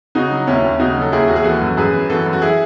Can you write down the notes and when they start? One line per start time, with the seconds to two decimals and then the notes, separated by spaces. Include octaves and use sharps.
0.15 C#3 D#4 F#4
0.32 F#3
0.47 D#2 C#4 E4
0.64 D#2
0.80 C#3 D#4 F#4
0.97 F#3 A4
1.12 D#2 E4 G#4
1.28 D#2 F#4
1.36 G#4
1.44 E3 F#4 A4
1.62 F#2
1.77 F#2 G#4 B4
1.93 E3
2.10 E3 F#4 A4
2.26 F#2
2.33 F#4
2.42 E4 G#4